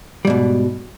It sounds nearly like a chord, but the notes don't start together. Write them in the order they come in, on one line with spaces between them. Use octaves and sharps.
G3 G#2 B2